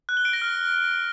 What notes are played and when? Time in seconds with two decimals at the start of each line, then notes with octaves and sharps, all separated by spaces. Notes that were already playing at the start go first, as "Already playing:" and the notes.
0.09 F#6
0.17 G7
0.25 D7
0.33 A#6
0.42 F6